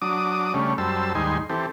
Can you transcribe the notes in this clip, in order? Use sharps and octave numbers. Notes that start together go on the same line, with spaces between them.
F#3 D4 D6 D#6
C#3 G3 A3 C#4 D4
F#2 G3 C5 A5 E6
D#2 G#2 G3 D#4 G#5 C6
E3 C4 G4 A4